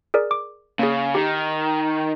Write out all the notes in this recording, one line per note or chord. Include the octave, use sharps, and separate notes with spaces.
G#4 A#4 D5
D6
C#3 A#3 G#4
D#3 G4